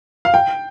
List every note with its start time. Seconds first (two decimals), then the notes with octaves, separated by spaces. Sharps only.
0.25 F5
0.34 G5